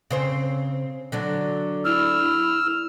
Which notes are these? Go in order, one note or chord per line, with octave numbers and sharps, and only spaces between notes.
C#3 C4 C5
D3 F#3 D4
E4 E6 F6